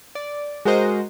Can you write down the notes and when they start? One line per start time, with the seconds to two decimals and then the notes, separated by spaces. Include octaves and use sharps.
0.15 D5
0.65 G#3 F#4 A#4 C5 D#5